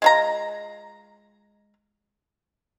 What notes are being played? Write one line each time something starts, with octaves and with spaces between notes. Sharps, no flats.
G#3 F4 A#5